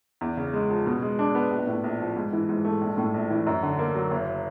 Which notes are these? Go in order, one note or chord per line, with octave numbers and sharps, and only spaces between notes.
E2
C#3
G#3
F3
B2
G#3
D4
B3
A#1
A2
A#1
F3
G#2
E3
G#2
A3
A#1
A2
A#1
E3
F#2
D3
A#3
F#3
F#1